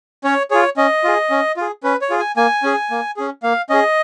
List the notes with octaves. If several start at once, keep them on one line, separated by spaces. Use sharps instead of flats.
C#4 C#5
F4 G#4 C#5
C#4 D#5
F4 G#4
C#4
F4 G#4
C#4 B4
C#5
F4 G#4
G#5
A#3 G#5
C#4 G#4
A#3
C#4 G#4
A#3 F5
C#4 G#4 D#5